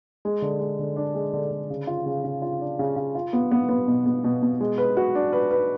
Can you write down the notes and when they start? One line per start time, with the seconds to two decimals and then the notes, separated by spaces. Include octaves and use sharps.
0.25 G#3
0.42 D3
0.60 G#3
0.79 D3
0.96 D4
1.15 G#3
1.33 D3
1.51 D3
1.70 C#3
1.87 F4
2.06 C#3
2.24 C#3
2.42 F4
2.61 D4
2.79 C#3
2.96 C#3
3.15 F4
3.33 B3
3.51 B3
3.69 B3
3.88 B2
4.06 B3
4.24 B2
4.43 B2
4.61 G#3
4.78 B4
4.97 F#4
5.15 D4
5.33 B4
5.51 B4